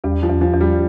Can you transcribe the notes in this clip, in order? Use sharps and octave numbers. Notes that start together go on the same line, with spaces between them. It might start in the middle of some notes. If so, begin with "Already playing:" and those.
E2 G3
F3
E2
F3
E2
G3